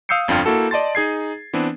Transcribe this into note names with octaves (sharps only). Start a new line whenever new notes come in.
F5 D#6 E6 G6 C7 C#7
G1 F2 D4 F4 G5 F6
A#3 E4 F#4 A4
D5 D#5 A5 C6 A6
D#4 G#4 G#6 C7
E3 B3 C4 D4